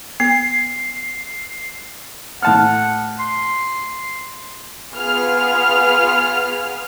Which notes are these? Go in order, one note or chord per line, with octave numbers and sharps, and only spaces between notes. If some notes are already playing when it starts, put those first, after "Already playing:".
B3 C7
A2 F#5 A5 F6
C6
B3 F4 G#4 F6